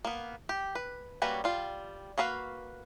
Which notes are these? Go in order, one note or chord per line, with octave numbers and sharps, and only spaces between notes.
A#3 B3
G4
B4
G3 A#3 C#4 F#4 B4
G3 F4
A#3 F#4 B4 F5